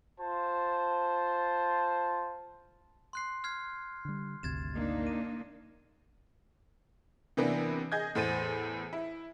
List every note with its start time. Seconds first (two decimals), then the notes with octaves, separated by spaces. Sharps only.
0.20 F4 C5 A5
3.13 C6 F#6 C7
3.44 F6 G#6 C7
4.05 D3 G3
4.43 G#1 D2 C3 G#6 A6 E7
4.75 A#3 D4 D#4
5.07 D#7
7.37 C3 E3 A#3 B3 D4
7.92 G#4 D#5 G6 G#6
8.15 E2 A2 C5 A6 D#7
8.93 E4